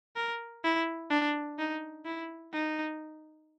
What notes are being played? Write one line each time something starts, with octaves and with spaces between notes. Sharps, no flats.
A#4
E4
D4
D#4
E4
D#4